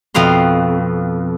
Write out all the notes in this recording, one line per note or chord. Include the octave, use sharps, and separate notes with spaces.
F2 B2 F5 C6